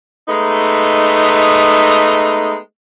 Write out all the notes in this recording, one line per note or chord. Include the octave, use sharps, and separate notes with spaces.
G#3 A3 B3 D#4